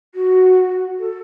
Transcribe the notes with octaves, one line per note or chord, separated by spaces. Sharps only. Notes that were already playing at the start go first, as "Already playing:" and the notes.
F#4
A4